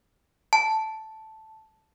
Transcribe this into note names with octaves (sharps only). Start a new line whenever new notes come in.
A5